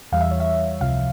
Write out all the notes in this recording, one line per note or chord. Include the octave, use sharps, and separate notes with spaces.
E2 E3 G3 F5
E5
C#5
E5
C#2 C3 F3 F5